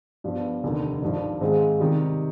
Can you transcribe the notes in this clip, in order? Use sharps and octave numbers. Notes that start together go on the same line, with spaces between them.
G2 F3 B3 F4
F1 D#2 D3
G#1 G2 F3
G#2 D#3 G#3 C4 F4
C3 D#3 G3